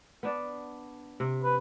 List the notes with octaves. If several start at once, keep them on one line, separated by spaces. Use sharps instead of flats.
B3 D4 D5
C3
B4